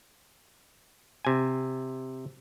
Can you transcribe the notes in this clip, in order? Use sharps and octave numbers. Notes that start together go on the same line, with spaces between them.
C3 G#5